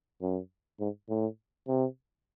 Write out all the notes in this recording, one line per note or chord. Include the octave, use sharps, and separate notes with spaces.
F#2
G#2
A2
C3